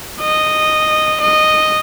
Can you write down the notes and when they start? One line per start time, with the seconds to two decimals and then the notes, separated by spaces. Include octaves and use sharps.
0.21 D#5
1.21 D#5